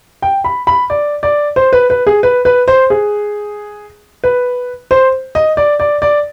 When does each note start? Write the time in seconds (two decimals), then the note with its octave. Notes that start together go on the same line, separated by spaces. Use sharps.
0.22 G5
0.44 B5
0.67 B5
0.90 D5
1.23 D5
1.56 C5
1.73 B4
1.90 B4
2.07 G#4
2.23 B4
2.45 B4
2.68 C5
2.90 G#4
4.24 B4
4.91 C5
5.35 D#5
5.57 D5
5.80 D5
6.02 D5